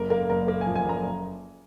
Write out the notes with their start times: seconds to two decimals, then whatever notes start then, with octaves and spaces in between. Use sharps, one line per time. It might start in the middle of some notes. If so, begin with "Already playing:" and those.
Already playing: F#1 A#4
0.10 A#3 A#4
0.29 F#1 A#4
0.48 A#3 A#4
0.61 F3 G#5
0.75 G#5
0.85 F#1 A#5